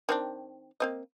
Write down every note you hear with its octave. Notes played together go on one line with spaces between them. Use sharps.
D#3 C4 D4
A#3 C4 D#5